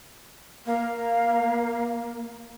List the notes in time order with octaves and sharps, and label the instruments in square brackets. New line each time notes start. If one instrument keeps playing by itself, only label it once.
[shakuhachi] A#3 [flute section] F5